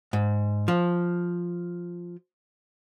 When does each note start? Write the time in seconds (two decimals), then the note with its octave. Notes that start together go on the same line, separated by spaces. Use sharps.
0.13 G#2
0.68 F3